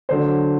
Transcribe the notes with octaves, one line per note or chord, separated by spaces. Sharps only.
D3 F#3 C5